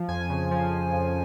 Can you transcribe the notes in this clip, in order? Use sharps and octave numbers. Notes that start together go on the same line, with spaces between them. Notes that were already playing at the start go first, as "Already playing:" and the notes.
Already playing: F3
F2 G#5
C#3
F3
F2
F2